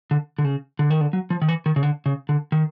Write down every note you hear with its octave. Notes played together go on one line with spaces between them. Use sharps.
D3
D3
C#3
D3
D#3
D3
F#3
F3
D#3
E3
D#3
C#3
D3
C#3
D3
D#3